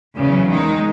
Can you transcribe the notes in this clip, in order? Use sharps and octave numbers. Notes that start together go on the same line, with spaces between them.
E2 C#3 F#3 B3
D#3 G#3 D#4